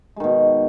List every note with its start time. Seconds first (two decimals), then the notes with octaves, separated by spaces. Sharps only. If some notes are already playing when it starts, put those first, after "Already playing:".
0.16 G#3
0.20 D#3
0.24 B2